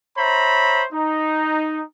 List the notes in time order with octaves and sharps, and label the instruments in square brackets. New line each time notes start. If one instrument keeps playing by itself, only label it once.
[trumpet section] C5 C#5 E5 A#5 B5
D#4